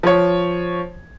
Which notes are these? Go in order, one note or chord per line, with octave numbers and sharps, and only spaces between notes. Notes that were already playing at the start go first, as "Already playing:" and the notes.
F3 C#5